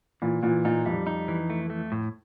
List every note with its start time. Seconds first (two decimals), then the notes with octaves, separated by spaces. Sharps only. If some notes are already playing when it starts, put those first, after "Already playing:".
0.22 A#2 E3
0.43 A#2 E3
0.65 A#2 D#4
0.86 F2 G3
1.07 D#4
1.28 E3
1.50 A3
1.70 A3
1.92 A2